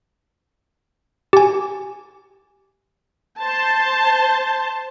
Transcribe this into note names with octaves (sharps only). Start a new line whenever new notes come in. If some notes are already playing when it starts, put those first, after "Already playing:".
G4 G#5
C5 A5